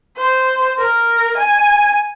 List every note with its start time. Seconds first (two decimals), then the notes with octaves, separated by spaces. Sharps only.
0.17 C5
0.78 A#4
1.38 G#5